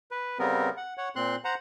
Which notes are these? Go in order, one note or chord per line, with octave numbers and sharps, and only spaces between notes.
B4
C#3 G3 B3 C4 A#4
F#5
C#5 F#5
A#2 C4 C6 F#6
C5 F#5 A#5